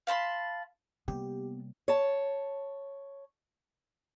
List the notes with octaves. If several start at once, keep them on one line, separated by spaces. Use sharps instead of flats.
F5 A5 B5 C6
C3 G3 A#3 B3 G4
C#5 A5